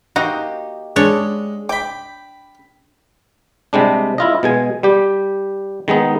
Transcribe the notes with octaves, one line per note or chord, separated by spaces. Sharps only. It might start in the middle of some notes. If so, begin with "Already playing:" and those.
A#3 D#4 F#4 G4
G#3 D4 C#5
G5 B5 D6
C3 G3 G#3 D4
E4 F4 D#5
B2 G#3 G#5
G3 G4
D#3 G#3 B3 D#4